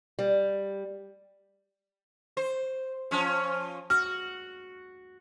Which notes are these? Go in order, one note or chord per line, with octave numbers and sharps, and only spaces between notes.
G3
C5
F3 C#4
F#4 F6